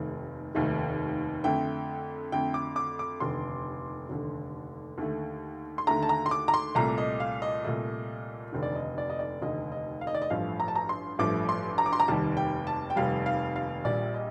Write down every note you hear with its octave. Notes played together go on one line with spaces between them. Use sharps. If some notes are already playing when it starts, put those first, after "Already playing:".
Already playing: F1 D#2 D#3 A3
F1 D#2 D#3 A3
F2 D3 A3 G5
F2 D3 A3 G5
D6
D6
D6
F1 D#2 D3 C6
F1 D#2 D3
D#2 D3 A3
C6
D#2 D3 A3 A#5
A5
A#5
C6
D6
A#5
C6
C2 A#2 A3 A#5
D#5
F5
D#5
C2 A#2 A3
F1 D#2 D3
D5
D#5
D5
D#5
D5
F1 D#2 D3 D#5
D#5
F5
D#5
D5
D#5
A1 G2 F3 A3 F5
A#5
A5
A#5
C6
A1 G2 F3 A3 D6
C6
A#5
D6
C6
A#5
F1 D#2 D#3 G3 A5
G5
A5
G5
F1 D#2 D#3 G3 F5
F5
F5
A#1 A#2 G3 D5
D#5